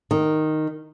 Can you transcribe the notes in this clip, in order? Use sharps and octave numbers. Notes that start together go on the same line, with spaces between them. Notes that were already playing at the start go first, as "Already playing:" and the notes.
D#3